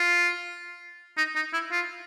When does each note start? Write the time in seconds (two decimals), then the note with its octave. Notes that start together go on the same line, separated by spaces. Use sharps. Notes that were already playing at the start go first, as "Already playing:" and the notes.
Already playing: F4
1.17 D#4
1.35 D#4
1.53 E4
1.72 F4